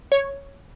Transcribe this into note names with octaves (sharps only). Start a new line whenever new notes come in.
C#5